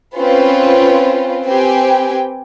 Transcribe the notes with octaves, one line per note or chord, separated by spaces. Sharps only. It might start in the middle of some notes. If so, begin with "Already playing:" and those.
C4 C#4 F4 B4
C4 G4 B4 G5 G#5